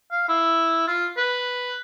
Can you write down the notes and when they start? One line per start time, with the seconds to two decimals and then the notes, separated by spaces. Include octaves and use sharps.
0.12 F5
0.29 E4
0.88 F4
1.17 B4